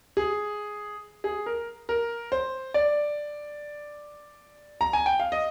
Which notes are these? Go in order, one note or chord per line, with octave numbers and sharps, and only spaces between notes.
G#4
G#4
A#4
A#4
C5
D5
A#5
G#5
G5
F5
D#5